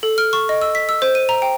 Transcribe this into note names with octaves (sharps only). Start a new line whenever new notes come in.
A4
F6
C#6
D#5
E6
B6
E6
C5
D#7
A#5
G5